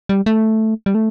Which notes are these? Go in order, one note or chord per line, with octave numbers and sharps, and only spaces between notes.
G3
A3
G3
A3